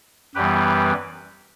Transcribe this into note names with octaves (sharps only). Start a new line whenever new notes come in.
F#2 E3 G3 B3 G4 B4